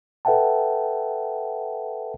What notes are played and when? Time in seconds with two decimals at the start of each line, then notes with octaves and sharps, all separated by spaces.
0.25 A4 B4 E5 F#5 G5 A5